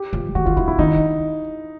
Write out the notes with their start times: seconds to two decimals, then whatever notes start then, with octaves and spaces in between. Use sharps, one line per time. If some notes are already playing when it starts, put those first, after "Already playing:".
Already playing: G4
0.13 F3
0.35 D#3 F#4
0.45 E3 F4
0.57 D#3 E4
0.67 E3 E4
0.78 D#3 D#4